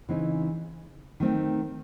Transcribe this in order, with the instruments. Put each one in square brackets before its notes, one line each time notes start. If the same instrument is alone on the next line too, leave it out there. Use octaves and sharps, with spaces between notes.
[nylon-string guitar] C#3 E3 C4 D#4
D#3 A3 C4